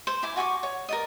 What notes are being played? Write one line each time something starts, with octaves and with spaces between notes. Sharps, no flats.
C5
E4 G#5 D6
F#4 G#5 C#6 D6
C#5
A#4 D5 D#5